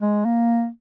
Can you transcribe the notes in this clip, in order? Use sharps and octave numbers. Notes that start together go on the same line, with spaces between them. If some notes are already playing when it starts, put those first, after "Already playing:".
G#3
A#3